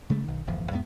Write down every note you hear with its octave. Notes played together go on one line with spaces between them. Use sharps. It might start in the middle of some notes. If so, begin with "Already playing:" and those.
C#3 G#3 A3
B1 D#3
D1 G1 E2 F3
E2 G#2 B3